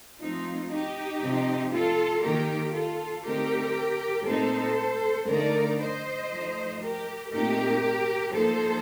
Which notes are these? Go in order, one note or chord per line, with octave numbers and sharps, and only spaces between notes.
F3 A3 C4 D#4 F4
D#4 G4
C3 F3 C4
F4 A4
D#3 A#3 D#4 G4 A#4
F4 A4
D3 A3 C4 D#4 G4 A#4
A#2 A3 C4 D#4 A4 C5
D3 A3 D#4 A#4 D5
C5 D#5
F3 A3 D#4
G4 A#4
A#2 A3 C4 D#4 G4 A#4
F3 A#3 D#4 A4 C5